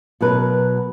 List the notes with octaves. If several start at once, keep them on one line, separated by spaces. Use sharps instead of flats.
B2 F#3 A#4 B4